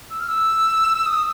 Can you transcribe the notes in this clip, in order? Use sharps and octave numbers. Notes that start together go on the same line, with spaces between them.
E6
F6
E6
D#6